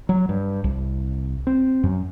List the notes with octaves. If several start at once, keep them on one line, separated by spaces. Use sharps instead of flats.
F#3
G2
C2
C4
F#2